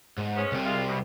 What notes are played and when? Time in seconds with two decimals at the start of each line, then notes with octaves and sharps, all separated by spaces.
0.18 G#2
0.36 G#3 B3 C#4
0.52 C2 C3
0.65 G#3 F4
0.89 B2